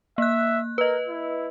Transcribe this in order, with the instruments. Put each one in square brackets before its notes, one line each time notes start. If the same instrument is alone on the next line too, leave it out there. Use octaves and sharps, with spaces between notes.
[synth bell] A#3 F#6 [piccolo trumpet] E5
[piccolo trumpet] A#4 [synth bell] B4 D#5
[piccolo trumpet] E4